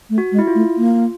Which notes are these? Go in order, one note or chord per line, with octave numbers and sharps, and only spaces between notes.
A3
F#4
G#3
E4
F4
A3
A#3